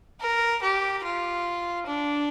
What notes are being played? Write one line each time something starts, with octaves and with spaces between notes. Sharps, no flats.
A#4
G4
F4
D4